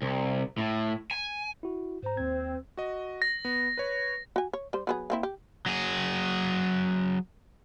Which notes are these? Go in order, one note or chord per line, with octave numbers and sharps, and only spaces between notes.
C2
A2
G#5
E4 F#4
G#2 C5 A#5
D#2 C4 G#6
F#4 D#5
A#6
B3
B4 C#5
F#4 G#5
C#5
G3 C5
F#3 B3 G#4
A#3 C4 E4
G4
F#3 G#4